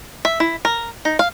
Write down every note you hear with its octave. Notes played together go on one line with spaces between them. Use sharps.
E5
E4
A#4
D#4
F5